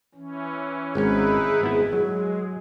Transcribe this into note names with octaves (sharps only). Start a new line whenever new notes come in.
E3 C#4
G#1 G#2 C#4 D#4 E4 G#4 B4
G#1 B3 E4
F#3 G#3